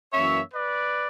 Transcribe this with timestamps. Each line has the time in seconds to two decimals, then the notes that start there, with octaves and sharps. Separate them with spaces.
0.13 F#2 E3 A#3 C#4 C#5 E5
0.52 B4 D5